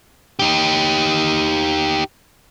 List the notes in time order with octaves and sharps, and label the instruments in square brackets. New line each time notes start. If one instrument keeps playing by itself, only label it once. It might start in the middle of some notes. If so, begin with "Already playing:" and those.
[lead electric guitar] D#4 G4